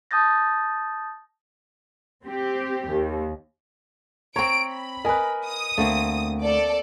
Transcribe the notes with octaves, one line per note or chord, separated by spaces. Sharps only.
A5 D#6 G6 A6 A#6
C4 G4
D#2
C4 C#5 A#5 D7
B5
A#4 B4 D#5 G#5
D#6
D2 A3 A#3 C4
A4 D5 D6